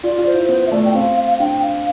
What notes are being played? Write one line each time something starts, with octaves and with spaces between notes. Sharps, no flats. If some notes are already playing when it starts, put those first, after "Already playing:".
F4 D5
F4
C5
E4
B3 C5
E5
A3 D5
G5
C4 F5
F5
F5
D4 G5
F5